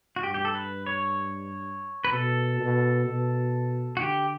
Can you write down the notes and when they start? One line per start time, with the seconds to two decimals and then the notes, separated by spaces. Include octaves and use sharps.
0.16 F#4
0.23 G2 G4
0.34 G4
0.45 A4
0.55 B4
0.86 C#5
2.05 B4
2.12 B2 A4
2.59 B2
3.06 B2
3.97 F#4
4.00 D3 G4